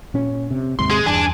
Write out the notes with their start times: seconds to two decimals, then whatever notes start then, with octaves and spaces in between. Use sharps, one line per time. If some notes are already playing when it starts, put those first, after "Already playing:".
0.14 A#2 C#4
0.51 C3
0.79 D#2 G#2 C3 C6
0.91 G#3
1.06 E2 G2 D4 G#5